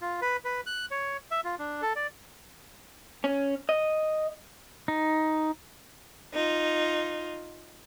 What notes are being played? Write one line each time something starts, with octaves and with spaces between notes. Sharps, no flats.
F4
B4
B4
F#6
C#5
E5
F4
D4
A4
D5
C#4
D#5
D#4
D#4 F4